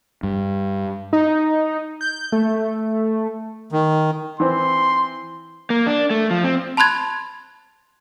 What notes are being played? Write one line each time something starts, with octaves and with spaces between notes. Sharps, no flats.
G2
D#4
G6
A3
D#3
E3 C4 C6
A#3
D4
A3
F3
C4
A5 B5 C6 F#6 G#6 A6